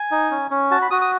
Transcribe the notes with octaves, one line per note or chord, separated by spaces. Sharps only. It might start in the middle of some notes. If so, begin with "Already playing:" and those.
Already playing: G#5
D#4
C#4
C#4
F#4 A5
B5
F#4 D#6
D#6